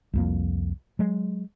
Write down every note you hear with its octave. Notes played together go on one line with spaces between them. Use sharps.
C2 F2 A#3
F#3 G#3